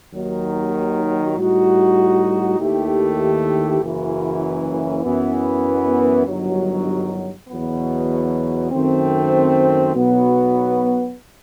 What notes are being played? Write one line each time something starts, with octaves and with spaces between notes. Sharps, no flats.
D#2 D#3 F#3
A2 G3 D#4 F#4
D#2 D#3 A3 E4 G4
F#1 F#2 E3
F#2 E3 B3
G1 G2 D#3 F#3
E2 B2 F#3 B3
F#2 D#3 A3 C4
B1 B2 F#3 B3 F#4